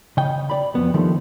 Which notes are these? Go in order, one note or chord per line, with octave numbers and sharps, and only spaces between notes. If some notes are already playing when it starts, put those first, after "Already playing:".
C#3 D#5 G5
D5 B5
F2 B3
D3 D#3 F3 G3 A3